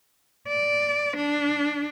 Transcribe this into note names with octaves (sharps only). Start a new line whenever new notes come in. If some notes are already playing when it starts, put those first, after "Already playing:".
D5
D4